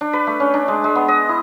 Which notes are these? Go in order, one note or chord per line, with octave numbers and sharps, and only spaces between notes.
D4
B4
A3
C#4
D4
G#3
G#3
B3
D#5
E4